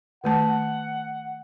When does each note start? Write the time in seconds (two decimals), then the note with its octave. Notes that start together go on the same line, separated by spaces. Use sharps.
0.24 D#3 A3 F#5 A5